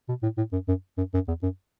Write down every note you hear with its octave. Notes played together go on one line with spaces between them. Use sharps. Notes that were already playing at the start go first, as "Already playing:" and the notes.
B2
A2
A2
F#2
F#2
F#2
F#2
E2
F#2